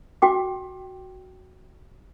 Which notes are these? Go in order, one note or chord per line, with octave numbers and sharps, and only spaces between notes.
F#4 G5 D6